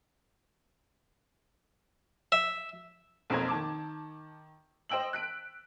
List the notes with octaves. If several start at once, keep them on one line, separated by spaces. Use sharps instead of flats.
E5
B1 F2 A#3 C5 A#5 G#6
D#3 A5 D6
C5 D#5 G5 E6 F#7
F#6 B6 D7